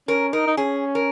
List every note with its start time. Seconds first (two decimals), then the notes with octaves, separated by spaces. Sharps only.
0.08 C#4 A#4
0.33 D#4 A#4
0.47 D#4
0.57 C#4 G#4
0.95 A#4